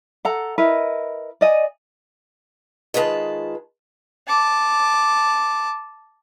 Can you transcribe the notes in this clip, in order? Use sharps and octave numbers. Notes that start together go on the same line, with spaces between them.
A4 F#5 A#5
E4 A#4 B4 D#5
D5 D#5 G#5
D#3 G#3 F4 B4 A5
A5 D6